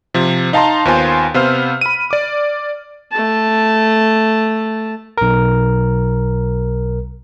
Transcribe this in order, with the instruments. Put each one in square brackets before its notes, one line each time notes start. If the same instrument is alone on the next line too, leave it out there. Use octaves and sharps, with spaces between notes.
[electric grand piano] C3 F3
D#4 F5 A5 A#5 C6
D#2 B3 F4 C5 G#5 C6
C3 B3 C5 F5 E6 F6
B5 D#7
D5 D6
[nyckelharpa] A3 A5
[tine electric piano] B1 A#4